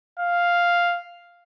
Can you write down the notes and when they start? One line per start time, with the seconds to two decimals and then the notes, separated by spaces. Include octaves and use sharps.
0.19 F5